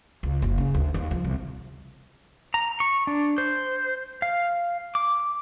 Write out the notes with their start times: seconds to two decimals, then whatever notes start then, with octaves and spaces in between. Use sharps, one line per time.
0.23 C#2
0.42 F#1
0.58 C#3
0.75 D2
0.94 D#2
1.11 F3
1.24 C2
2.54 A#5
2.80 C#6
3.07 D4
3.38 C5
4.22 F5
4.95 D6